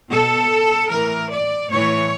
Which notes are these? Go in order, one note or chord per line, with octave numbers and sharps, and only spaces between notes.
B2 A4
A2 E3 A#4
D5
A2 E3 C#5